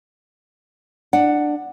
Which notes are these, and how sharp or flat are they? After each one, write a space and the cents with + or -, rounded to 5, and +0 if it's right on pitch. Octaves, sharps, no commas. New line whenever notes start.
D4 +15 F#5 +0